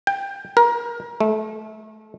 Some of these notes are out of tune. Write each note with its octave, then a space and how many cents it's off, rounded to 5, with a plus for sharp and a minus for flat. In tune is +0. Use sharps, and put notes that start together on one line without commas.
G5 +15
A#4 +25
A3 -25